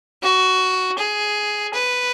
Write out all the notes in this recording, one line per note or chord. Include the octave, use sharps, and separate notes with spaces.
F#4
G#4
B4